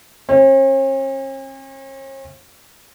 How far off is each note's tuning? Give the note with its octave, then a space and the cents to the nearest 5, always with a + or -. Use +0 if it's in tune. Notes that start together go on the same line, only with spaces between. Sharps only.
C#4 -45